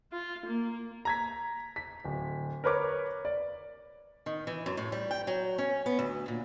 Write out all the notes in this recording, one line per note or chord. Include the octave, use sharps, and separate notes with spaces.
F4
A#3
A#5 G#6 B6
B6
D1
A#4 B4 C#5 D6
D5
D#3
E3
F#2
A2
G3
G5
F#3
C#4
B3
D2
A#2